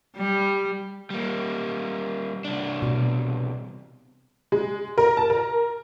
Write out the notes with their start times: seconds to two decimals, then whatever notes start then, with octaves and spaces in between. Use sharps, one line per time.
0.16 G3
1.10 G3 A#3
2.45 C2 D4
2.82 B2
4.52 G#3
4.98 A#4
5.17 A5
5.30 A#4